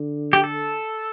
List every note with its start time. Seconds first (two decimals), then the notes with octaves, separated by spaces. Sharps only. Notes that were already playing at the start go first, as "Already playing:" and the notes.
Already playing: D3
0.33 G4
0.44 A4